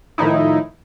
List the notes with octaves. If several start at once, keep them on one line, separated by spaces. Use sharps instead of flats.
A2 D#3 F3 D#4 E4